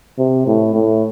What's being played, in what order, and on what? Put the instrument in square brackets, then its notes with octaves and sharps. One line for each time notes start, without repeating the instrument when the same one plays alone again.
[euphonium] C3
A2
A2